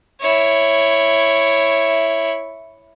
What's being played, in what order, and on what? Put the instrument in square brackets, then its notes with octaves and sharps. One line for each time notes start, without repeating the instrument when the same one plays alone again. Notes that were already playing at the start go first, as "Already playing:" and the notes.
[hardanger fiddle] E4 C#5